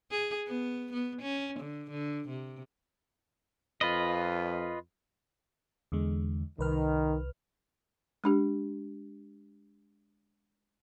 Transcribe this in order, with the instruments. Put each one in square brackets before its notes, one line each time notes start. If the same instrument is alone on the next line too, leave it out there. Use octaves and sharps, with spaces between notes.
[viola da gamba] G#4
B3
B3
C#4
D3
D3
C3
[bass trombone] F2 [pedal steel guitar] F4 B4 D#5
[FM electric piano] E2 D3 G#3
[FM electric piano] C2 B4 F6 [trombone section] D#3
[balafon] G#3 D4 G4